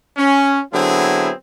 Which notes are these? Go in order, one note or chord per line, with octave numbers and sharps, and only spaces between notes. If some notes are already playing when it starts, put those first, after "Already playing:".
C#4
D3 F#3 B3 C4 E4 G#4